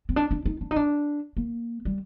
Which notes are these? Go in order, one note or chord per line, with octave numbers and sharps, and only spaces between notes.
C4
D4
D4
D#4
D4
D#4
D4
A#3
G3